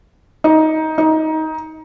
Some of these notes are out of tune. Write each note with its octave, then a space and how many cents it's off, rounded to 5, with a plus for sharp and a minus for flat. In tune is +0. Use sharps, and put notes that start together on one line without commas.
D#4 +15
D#4 +20